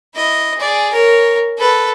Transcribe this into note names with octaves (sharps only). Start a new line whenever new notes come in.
E4 D#5
G#4 D5
A#4 C#5
A4 B4